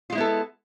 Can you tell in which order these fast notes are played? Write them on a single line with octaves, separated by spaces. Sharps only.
F4 G#3 E4 B3 A4